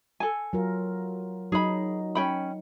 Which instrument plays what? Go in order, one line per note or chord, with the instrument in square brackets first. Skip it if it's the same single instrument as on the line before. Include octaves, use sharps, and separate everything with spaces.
[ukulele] A4 G#5
[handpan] F#3 F4 A#4
[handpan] F#3 D#4 [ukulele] G#4 B5
[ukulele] C#4 G5 B5